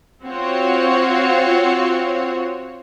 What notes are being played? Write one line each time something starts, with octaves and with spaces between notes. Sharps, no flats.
C4 F4 F#4 C#5